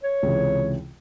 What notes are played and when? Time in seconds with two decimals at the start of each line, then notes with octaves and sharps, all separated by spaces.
0.03 C#5
0.23 C#2 C3 E3